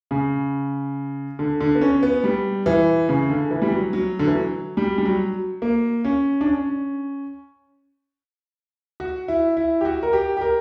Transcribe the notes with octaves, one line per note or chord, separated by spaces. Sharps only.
C#3
D3
D3
B3
C#4
B3
G3
E3
C#3
D3
E3
G3
F#3
F#3
D3
E3
F#3
G3
G3
F#3
A#3
C#4
D4
C#4
F#4
E4
E4
G4
F#4
A#4
G4
G4
A#4